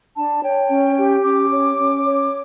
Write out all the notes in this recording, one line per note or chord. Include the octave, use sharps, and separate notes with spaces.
D4 A5
C#5 G5
C#4
G4
C#4 D6
C#5
C#4
C#5